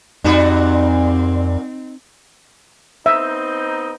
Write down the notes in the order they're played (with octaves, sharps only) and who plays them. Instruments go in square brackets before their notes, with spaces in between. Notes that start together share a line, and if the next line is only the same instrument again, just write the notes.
[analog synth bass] F2 [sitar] A#2 G3 F#4 [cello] C4 [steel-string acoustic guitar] D#4
[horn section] B3 C4 D#4 [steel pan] E5